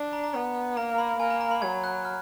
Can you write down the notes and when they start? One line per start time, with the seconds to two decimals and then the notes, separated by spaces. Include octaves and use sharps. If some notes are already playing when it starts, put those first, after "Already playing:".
Already playing: D4
0.13 A#5
0.24 A#5
0.34 B3 A#5
0.77 A#3 A#5
0.98 B5
1.20 A#3 G#5
1.30 A#5
1.41 A#5
1.51 B5
1.62 F#3 G#6
1.84 F#6
2.05 F6